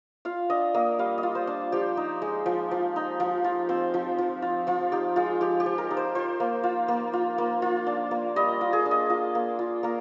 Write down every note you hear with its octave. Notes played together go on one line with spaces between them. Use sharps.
F4 F5
D4 D#5
A#3 D#5
G3 F5
D#5
F4
C5
D4
F3 G4
D#4
G#3
F3
F3
D#4
F3
F4
C4
F3
F3
F4
F3 F4
D#4 G4
G#3 F4
F3 G4
G4
F3
A#4
D#4
C5
F4 C5
A#3
F4
A#3
F4
A#3
F4
D4
A#3
G3 D#5
F4
G#4
D4
D#5
F4
A#3
F4
A#3 A#4